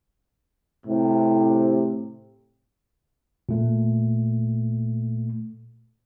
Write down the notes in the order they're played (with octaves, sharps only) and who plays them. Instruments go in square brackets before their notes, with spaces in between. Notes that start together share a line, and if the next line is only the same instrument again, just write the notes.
[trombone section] A2 C3
[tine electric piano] A#2 A3